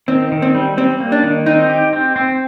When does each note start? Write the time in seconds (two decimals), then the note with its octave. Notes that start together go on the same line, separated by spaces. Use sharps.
0.08 D#3 C4
0.32 D#3
0.42 C4
0.55 G3
0.77 G3 C4
1.00 A#3
1.12 D4
1.24 D#3
1.46 C4 D#4
1.69 G4
1.93 C4
2.16 C4